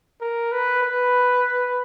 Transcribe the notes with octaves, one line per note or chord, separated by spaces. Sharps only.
A#4
B4
B4